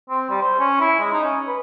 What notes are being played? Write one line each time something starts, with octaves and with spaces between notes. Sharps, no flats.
C4
G3
C5
C#4
E4
G#3
D#4
C#4
B4